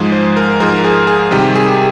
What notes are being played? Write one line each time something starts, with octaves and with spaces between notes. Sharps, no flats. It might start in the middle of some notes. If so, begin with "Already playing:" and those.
Already playing: G#2 F3 G#3 G#4
C5
A#4
G#2 F3 G#3 A#4
G#4
G#4
C3 D#3 G3 G4
G#4